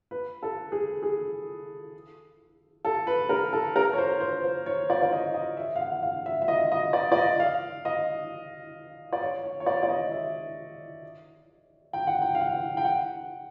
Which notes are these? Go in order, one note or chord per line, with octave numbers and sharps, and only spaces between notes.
B4
A4
G#4
G#4
A4
B4
A#4
A4
A#4
C#5
C5
C5
C5
C#5
D5
D5
D#5
D#5
E5
F5
F#5
F#5
F5
E5
E5
D#5
D#5
D5
D5
D#5
F5
D#5
D5
C#5
C#5
C#5
D5
D5
D#5
E5
G5
F#5
G5
F5
F#5
G5
F#5